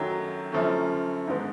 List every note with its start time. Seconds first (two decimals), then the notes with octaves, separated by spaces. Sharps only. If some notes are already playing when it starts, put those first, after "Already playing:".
Already playing: F#2 D#3 F#3 A3 G5
0.52 F#2 D3 F3 A3 C#4
1.27 G#2 D#3 G#3 B3